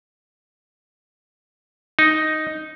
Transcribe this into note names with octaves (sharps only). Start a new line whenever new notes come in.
D#4